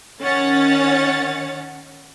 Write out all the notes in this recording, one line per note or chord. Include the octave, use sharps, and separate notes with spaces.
D#3 C#4 C#5 F#5 A6